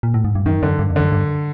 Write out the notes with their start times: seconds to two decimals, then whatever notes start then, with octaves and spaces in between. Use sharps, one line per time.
0.03 A#2
0.14 A2
0.25 G#2
0.35 G2
0.46 F#2 D#3
0.63 F#2 D3
0.79 G2
0.90 F2
0.96 F#2 D3
1.12 G2